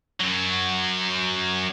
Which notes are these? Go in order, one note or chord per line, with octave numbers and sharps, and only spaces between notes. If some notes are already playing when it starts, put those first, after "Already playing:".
F#2 F#3